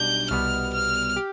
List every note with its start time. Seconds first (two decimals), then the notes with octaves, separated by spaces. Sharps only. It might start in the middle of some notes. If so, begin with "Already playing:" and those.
Already playing: B1 B2 G3 D4 G6
0.30 C2 B2 G3 B3 F6
0.73 F6
1.16 G4